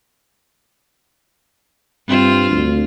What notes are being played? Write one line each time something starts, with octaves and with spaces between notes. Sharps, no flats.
G2 C4 F4
D2